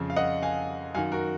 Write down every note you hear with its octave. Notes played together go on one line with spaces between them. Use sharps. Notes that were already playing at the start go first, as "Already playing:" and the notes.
Already playing: F2 C#3
F5
D#5 F#5
F5 G#5
F#2 D#3 F5 G#5
F#4 A#4